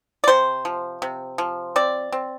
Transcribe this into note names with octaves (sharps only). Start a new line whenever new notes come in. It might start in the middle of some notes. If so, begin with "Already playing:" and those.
D5
C3 C5
F3
C3
F3
C4 D5
C4